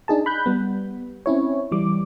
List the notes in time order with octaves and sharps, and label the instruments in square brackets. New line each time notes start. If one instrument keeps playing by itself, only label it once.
[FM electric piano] D4 D#4 G#4 A5
B5 F#6 G6
G3 B3
C4 C#4 E4 C#5
E3 G3 D6